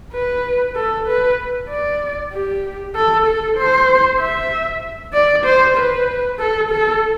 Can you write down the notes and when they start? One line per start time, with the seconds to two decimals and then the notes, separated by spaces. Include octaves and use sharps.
0.13 B4
0.76 A4
1.07 B4
1.70 D5
2.33 G4
2.95 A4
3.26 A4
3.57 C5
4.20 E5
5.14 D5
5.45 C5
5.77 B4
6.39 A4
6.71 A4